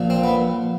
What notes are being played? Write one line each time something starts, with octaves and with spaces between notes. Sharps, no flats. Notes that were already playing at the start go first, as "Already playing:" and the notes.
Already playing: A#1 A#2 F3
C4
B3